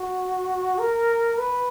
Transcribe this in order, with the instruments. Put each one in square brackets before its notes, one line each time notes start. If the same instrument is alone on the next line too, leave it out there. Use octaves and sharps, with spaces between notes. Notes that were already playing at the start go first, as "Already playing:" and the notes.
Already playing: [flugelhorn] F#4
A#4
B4